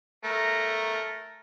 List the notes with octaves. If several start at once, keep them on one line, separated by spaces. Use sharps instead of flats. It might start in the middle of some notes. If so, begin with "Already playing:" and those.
A3 A#4